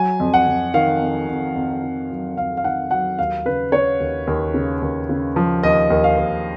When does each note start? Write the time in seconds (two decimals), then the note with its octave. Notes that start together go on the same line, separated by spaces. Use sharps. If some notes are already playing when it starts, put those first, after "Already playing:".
Already playing: F#3 G#5
0.20 F2
0.34 F#5
0.47 F2
0.74 D#3 F5
1.01 F2
1.28 F2
1.55 F2
1.83 D#3
2.10 F#3
2.37 F2 F5
2.57 F5
2.64 D#3 F#5
2.91 F#3 F#5
3.19 D#2 F5
3.45 C#3 B4
3.72 C#3 C#5
4.00 D#2
4.27 D#2
4.54 C#3
4.82 D#2
5.09 C#3
5.36 F3
5.63 D#2 D#5
5.90 D#2
6.04 F5
6.17 D#2